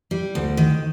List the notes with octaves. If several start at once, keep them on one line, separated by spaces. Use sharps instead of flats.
G3
D2
D#3